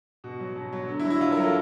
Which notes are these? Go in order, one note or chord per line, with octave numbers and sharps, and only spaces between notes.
B2 F#4
F#3
B2
F#3
D3
E4
F#3
E4
D3 F4
A#4
F#3
A4